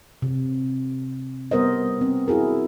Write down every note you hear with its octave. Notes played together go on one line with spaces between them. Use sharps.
C3
G3 B3 A#4 C5 D#5
C4
E4 F#4 G#4 A#4